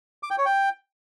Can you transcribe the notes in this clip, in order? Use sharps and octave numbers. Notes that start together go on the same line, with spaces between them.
D6
G5
C#5
G5